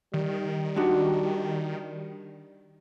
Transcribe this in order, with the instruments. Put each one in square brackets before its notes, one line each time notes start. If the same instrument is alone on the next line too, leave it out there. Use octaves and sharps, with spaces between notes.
[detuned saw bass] D#3 [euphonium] G3
[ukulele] D4 D#4 F#4